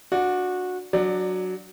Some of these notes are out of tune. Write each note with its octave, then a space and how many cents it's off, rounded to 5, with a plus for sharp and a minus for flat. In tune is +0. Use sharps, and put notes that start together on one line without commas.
D4 +0 F#4 -20 D5 +0
F#3 +0 D4 +0 D5 +20